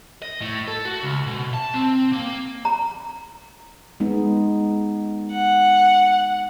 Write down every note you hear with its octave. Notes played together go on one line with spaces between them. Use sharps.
D#5
A2
A4
F#4
C#2
B2
A5
C4
A#3
A#5
G#3 B3 D#4
F#5